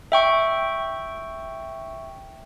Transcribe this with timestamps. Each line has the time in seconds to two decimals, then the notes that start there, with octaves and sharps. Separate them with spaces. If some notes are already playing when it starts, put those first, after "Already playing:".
0.12 E5 G5 C#6